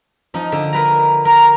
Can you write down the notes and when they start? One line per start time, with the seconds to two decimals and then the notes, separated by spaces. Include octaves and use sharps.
0.34 F3 D#4
0.52 D3
0.73 A#4 B4 A#5
1.25 A#4 A#5